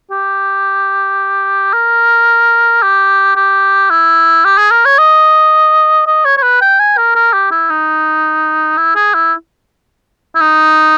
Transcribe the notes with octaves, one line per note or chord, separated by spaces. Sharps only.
G4
A#4
G4
G4
E4
G4
G#4
A#4
C#5
D#5
D#5
C#5
C#5
B4
G5
G#5
A#4
A#4
G4
E4
D#4
E4
G#4
E4
E4
D#4